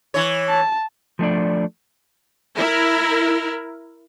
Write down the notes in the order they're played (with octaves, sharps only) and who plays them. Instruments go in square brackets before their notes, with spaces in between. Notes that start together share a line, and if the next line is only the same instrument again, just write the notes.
[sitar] E3 C#5
[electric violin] A5
[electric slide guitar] F3 A3 D4 D5
[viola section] E4 A#4